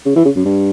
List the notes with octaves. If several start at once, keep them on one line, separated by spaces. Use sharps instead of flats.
C#3
E3
C#3
F#2
G2